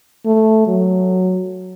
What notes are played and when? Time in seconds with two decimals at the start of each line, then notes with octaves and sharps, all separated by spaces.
0.25 A3
0.67 F#3